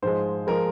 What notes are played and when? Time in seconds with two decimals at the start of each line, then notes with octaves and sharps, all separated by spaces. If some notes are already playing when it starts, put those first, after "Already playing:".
0.02 G#2 F3 G#3 C5
0.47 F3 G#3 A#4